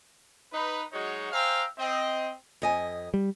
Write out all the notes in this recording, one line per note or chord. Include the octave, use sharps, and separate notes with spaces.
D#4 B4 B5
F#3 G#3 D#4 F#4 C#5
C5 E5 F5 G5 G#5 A#5
C4 D#5
F2 D#5 G#5
G3